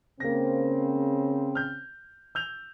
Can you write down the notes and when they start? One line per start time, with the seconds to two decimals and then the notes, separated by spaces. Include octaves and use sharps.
0.20 C#3 A#3 C4 A#6
1.55 F6 G6
2.35 E6 G6 F7